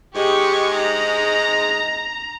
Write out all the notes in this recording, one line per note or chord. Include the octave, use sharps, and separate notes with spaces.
G#2 G#3 G4 C#6
A#5